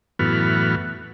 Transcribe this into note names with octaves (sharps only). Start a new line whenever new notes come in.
F#2 A2 E3 B3 F#4 F6